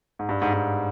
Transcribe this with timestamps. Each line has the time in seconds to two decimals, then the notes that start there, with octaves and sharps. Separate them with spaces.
0.19 G#2
0.29 G2
0.42 G#2
0.53 G#2